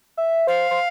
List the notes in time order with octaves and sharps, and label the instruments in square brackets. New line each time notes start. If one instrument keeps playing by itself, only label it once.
[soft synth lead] E5
[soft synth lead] C5 [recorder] F5
[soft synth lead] C5